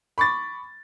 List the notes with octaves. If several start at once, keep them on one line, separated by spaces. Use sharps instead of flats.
B5 C#6 D6 A6